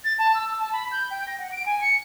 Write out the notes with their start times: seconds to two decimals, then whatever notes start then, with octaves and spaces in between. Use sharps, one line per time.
0.04 A6
0.19 A5
0.35 E6
0.59 A5
0.72 B5
0.92 G6
1.11 G5
1.27 A#6
1.39 F#5
1.52 D7
1.66 G#5
1.81 C#7